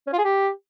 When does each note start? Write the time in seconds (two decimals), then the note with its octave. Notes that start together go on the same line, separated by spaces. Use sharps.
0.07 C#4
0.13 F4
0.18 G#4
0.24 G4